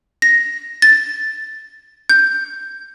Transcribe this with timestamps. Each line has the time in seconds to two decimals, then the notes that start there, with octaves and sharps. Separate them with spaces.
0.22 A#6
0.82 A6
2.09 G6